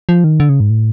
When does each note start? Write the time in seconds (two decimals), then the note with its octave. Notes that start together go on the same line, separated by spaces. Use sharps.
0.09 F3
0.24 D#3
0.40 D3
0.49 C#3
0.60 G#2
0.70 A2